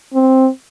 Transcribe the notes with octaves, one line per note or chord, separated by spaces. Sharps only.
C4